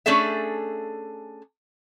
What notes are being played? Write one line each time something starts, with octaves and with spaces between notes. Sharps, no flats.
A3 C#4 D4 G#4 A4 E5